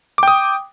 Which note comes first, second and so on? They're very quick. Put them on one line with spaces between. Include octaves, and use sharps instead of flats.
D6 G5 D#6